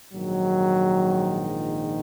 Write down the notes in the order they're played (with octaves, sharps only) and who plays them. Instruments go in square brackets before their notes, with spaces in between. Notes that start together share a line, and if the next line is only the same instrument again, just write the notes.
[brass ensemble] A#1 G#2 D#3 F#3
F3